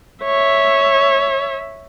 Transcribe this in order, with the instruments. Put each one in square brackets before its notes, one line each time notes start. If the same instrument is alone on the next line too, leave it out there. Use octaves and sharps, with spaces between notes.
[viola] C#5 E5